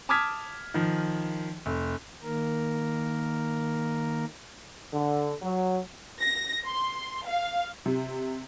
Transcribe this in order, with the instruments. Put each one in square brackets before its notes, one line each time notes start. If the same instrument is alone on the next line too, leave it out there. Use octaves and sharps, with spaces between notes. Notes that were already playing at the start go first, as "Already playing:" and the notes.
[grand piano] A5 D6 D#6 F6 G#6 B6
D#3 F3
F1
[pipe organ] D#3 A#3 A#4
[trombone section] D3
F#3
[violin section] A#6
C6
F5
[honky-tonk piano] C3